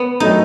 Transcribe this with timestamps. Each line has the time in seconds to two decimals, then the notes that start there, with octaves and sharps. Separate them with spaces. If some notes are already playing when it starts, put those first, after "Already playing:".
Already playing: B3
0.20 D#3 F#3 A3 D#4